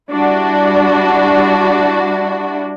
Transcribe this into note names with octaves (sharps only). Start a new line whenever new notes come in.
G3 D4 E4 F#4